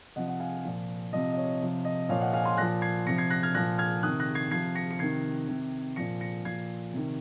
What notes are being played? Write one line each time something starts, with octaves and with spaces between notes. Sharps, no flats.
C3 F3 D#5 F#5
D#5 F#5
F5 G#5
A#2 F3
C3 F3 D#5
D#5
C#5
C3 F3
D#5
A#2 F3 C#5 F5
D#5 F#5
F5 G#5
G#5 C6
A#2 F3 F#6 A#6
G#6 C7
C3 F3 A#6 C#7
G#6 C7
F#6 A#6
F6 G#6
A#2 F3 F#6 A#6
F6 G#6
C3 D#3 D#6 F#6
F#6 A#6
G#6 C7
C3 F3 G#6 C7
A#6 C#7
C#7
C3 D#3 G#6 C7
C3 D#3
A#2 F3 A#6 C#7
A#6 C#7
A#2 F3 G#6 C7
C3 D#3